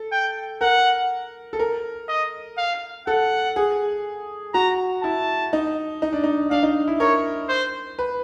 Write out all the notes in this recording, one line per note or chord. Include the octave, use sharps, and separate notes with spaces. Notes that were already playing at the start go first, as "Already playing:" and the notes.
Already playing: A4
G5
A#4 F#5
A4
A#4
D#5
F5
A4 F#5
G#4
F#4 A#5
E4 A5
D#4
D#4
D4
D#4
D4 F5
D#4
E4
A#4 C#5
C5
B4